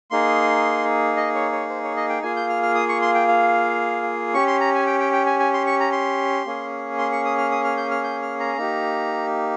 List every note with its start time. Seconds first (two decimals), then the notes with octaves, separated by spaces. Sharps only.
0.11 A#3 D#4 G#4 C6
1.17 D#5
1.35 C#5
1.52 C#5
1.69 C5
1.83 C#5
1.96 D#5
2.09 G5
2.22 A#3 F4 G#4 G#5
2.37 G6
2.49 F6
2.63 F6
2.75 D#6
2.89 C#6
3.02 C6
3.15 G5
3.28 F5
4.34 C#4 G4 C#6
4.47 C6
4.60 A#5
4.74 G#5
4.87 G5
5.00 G5
5.13 G5
5.26 G#5
5.40 G#5
5.53 C6
5.66 C#6
5.80 A#5
5.92 C6
6.46 A#3 C#4 G#4
6.98 C6
7.12 C#6
7.25 D#6
7.38 F6
7.51 D#6
7.64 F6
7.77 G6
7.91 F6
8.04 G6
8.22 F6
8.40 A#5
8.57 A#3 D#4 G4